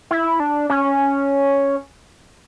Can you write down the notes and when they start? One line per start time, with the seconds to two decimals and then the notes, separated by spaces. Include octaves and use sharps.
0.11 E4
0.40 D4
0.70 C#4